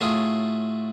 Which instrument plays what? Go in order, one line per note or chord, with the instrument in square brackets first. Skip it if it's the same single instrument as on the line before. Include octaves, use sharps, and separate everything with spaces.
[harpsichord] A2 F#3 A3 F4 G#4